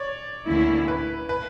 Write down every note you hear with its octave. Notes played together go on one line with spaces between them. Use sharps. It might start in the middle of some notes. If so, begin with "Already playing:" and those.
Already playing: C#5 D5
D2 D3 A#3 C#4 E4
B4
B4